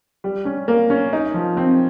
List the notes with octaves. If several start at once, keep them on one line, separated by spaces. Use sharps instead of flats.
G3
C#4
A#3
C#4
D#4
F3
C4